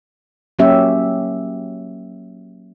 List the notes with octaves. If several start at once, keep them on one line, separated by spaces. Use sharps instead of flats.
F#3 A#3 C#4 G4 E5